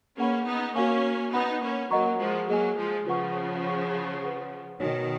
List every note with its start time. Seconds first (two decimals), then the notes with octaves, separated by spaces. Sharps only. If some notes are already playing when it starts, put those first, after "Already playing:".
0.18 A#3 C#4 G#4 B4 F#5 B5
0.46 B3 D#4
0.75 A#3 C#4 F#4 C#5 F5 G#5 C#6
1.33 B3 D#4 B4 F#5 B5
1.62 A#3 C#4
1.90 F#3 A#3 A#4 D#5 F#5 A#5 C#6
2.19 F3 G#3
2.48 F#3 A#3 G#4 D#5 G#5
2.77 F3 G#3
3.06 C#3 F3 F4 B4 F#5 C#6
3.65 C#5 F#5 C#6
4.23 B4 F#5 C#6
4.80 B2 D#3 D#4 F#4 C#5 G#5